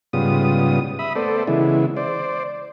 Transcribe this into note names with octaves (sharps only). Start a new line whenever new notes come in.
G#2 C#3 G3 B3 F4 D#6
E5 B5 D#6
A3 B3 A4 C5 D5
C#3 E3 G#3 B3 E4
C5 D5